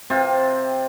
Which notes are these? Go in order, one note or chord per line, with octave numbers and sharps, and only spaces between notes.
C3 C4 F4